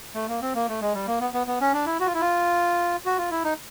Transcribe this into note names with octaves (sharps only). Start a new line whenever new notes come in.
A3
A#3
C4
A#3
A3
G#3
G3
A#3
B3
B3
B3
C#4
D4
E4
F#4
F4
E4
F4
F#4
F4
E4
D#4